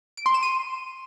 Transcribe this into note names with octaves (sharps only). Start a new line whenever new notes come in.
D7
C6
E7
D#7